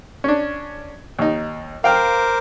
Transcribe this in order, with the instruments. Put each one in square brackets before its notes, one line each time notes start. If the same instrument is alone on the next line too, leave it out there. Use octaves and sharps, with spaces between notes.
[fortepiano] C#4 D4
D#2 D#4
[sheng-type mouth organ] A#4 C5 D6 [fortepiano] F5 G5 F6